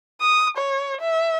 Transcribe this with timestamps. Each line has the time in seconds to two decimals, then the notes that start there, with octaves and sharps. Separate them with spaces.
0.21 D#6
0.57 C#5
1.01 E5